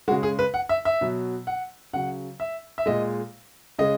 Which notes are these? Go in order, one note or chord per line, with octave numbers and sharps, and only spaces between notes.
C#3 G#3 F#4
G#4
B4
F#5
E5
E5
B2 F#3
F#5
C#3 F#3 F#5
E5
E5
A#2 G#3 D#5
C#3 G#3 D#5